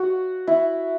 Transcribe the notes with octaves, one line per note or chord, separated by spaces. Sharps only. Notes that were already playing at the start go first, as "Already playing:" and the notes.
Already playing: F#4
E4